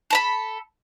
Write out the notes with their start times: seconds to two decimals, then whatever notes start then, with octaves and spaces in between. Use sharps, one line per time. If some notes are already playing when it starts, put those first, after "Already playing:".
0.10 A4 A#5 B5